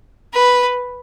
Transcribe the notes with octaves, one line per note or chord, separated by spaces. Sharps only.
B4